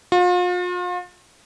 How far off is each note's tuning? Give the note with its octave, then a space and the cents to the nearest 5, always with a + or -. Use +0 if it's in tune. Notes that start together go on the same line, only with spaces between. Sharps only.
F4 +40